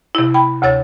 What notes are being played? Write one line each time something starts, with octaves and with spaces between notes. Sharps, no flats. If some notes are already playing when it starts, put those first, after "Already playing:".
C3 E4
G5 B5
D2 C3 C#5 A6